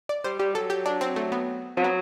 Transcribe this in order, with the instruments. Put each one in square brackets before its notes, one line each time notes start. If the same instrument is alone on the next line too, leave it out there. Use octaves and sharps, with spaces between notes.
[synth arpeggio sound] D5
[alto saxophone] G3 [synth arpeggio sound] C5
[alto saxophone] G3 [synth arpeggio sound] G4
[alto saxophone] F#3 [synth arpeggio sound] A4
[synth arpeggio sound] G4
D4
C4
A3
B3
[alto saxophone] F#3 [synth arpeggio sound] C4
[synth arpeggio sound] B3